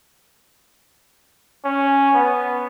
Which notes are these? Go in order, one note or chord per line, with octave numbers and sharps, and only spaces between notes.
C#4
B3